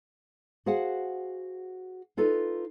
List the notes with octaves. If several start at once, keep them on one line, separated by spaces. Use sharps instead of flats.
F#4 G#4 C5 F5 F#5
D#4 F4 A4 B4